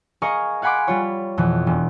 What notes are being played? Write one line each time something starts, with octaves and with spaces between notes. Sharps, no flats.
G#4 A#4 D#5 F5 C#6
F5 F#5 G#5 B5 C6 D6
G3 F4 C#5
F2 B2 E3
E1